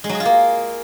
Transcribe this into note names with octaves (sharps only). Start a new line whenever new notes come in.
G#3
F#3
G#4
F4
A#3